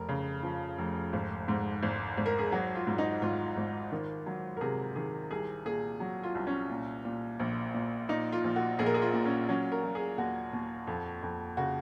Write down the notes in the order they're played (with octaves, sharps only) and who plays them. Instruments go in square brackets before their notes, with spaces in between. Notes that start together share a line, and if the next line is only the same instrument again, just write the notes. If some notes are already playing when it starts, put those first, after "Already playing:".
Already playing: [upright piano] F1 A#4
C#3
F3
F1
G#1
G#2
G#1
G#1
A#4
G#4
F#3 F#4
F4
G#2
D#4
G#1 F4
G#1
D#3
F#3
A#4
C3 G#4
D#3 G#4
C2 G#4
A#2 G#4
F#3
F4
C2
C#4
A#2
A#2
A#1
A#2
A#2 D#4
F4
A#1
F#4
A#1 G#4
A#4
G#4
F4
A#2
C#4
F#3 C#4
A#4
F#3
G#4
D#2 F#4
D#2
F2
F2
C#3 F#4